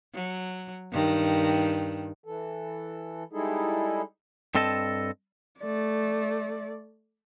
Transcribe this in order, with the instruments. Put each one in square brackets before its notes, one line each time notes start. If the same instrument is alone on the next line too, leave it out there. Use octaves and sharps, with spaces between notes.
[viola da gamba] F#3
G2 D#3
[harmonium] E3 A4
G3 G#3 D#4 E4 G#4 A4
[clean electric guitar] G2 C4 A4 D#5 A5
[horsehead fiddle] A3 D5